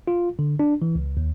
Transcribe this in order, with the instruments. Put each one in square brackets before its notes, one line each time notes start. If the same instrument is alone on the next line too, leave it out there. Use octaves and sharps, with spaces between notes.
[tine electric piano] F4
D3
D4
E3
C#2
D#2